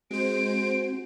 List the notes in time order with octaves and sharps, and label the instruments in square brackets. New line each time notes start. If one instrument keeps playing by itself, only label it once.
[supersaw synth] G#3 C5 [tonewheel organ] C4 F#4 [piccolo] D7